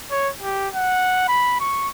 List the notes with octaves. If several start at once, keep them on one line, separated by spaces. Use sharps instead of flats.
C#5
G4
F#5
B5
C#6